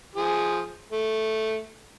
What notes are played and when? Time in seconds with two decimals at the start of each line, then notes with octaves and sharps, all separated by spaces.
0.16 F3 G#4
0.91 A3